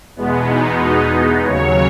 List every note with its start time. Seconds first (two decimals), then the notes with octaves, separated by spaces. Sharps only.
0.16 E2 B2 G#3 B3
0.49 D#4
1.45 D#2 C#3 F#3 C#5